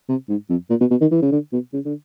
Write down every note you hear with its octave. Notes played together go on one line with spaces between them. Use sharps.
C3
G#2
F2
A#2
B2
B2
D#3
E3
C#3
D3
B2
C#3
D3